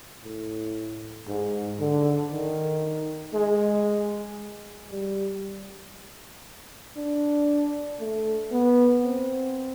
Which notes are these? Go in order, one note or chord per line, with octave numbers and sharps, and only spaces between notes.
A2
G#2
D3
D#3
G#3
G3
D4
A3
B3
C4